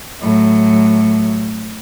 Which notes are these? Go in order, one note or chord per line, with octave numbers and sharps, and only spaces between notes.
A2 F#3